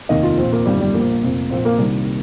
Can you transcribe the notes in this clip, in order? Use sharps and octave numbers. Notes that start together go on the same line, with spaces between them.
F1 D#2 D#3 D#5
F4
A#1 A#2 F3 C4
A#3
G1 F2 D#3 G3
G3
A#1 A#2 F3 A#3
F1 F2 F3
A#1 A#2 F3 C4
A#3
C2 C3 D#3 G3